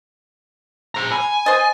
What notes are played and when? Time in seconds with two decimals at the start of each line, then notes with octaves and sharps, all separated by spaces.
0.95 C5 A#5
1.12 G#5 B5
1.46 C5 D#5 A6